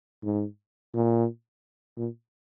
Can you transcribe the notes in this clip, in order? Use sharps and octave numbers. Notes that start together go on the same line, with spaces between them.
G#2
A#2
A#2